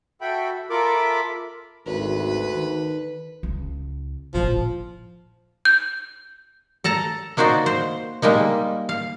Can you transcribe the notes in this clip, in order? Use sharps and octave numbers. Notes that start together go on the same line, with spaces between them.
F#4 A4 E5 G5 B5
F4 A4 A#4 E5 B5 D6
G#1 D2 B4
D#3
C#2
A1 A#2 F3
G6
A4 A5 A#5
A#3 D#4 F#4 C5 D5
C5
G3 G#3 A#3 D#4
F5